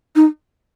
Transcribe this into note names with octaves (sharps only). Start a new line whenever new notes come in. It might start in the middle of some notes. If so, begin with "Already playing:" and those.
D#4